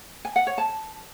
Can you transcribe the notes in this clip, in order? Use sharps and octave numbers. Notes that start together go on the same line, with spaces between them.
G#5
F#5
C#5
A5